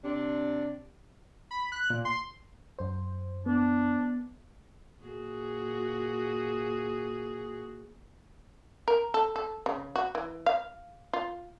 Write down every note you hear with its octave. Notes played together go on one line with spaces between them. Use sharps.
C3 C4 D4
B5
F#6
A#2
C6
F#2 C5
B3 D4
A#2 F#4 G#4
A#4
A4
A4
C#3
F#4
E3
F5
F4